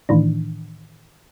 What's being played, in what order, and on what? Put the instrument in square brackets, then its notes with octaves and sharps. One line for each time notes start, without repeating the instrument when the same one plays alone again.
[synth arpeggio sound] A2 D#3 E3 D4